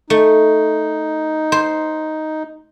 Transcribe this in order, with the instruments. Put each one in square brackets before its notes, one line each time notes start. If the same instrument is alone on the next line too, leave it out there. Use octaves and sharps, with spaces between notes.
[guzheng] A3 [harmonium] D#4
[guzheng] C5